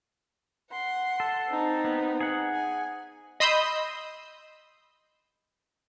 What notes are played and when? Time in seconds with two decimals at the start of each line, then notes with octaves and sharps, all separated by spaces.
0.71 F#5 C6
1.20 A4
1.50 C4 D#4
1.84 B3
2.21 G#4 F#5
2.53 G#5
3.40 D#5 B5 C6 D#6 E6 G6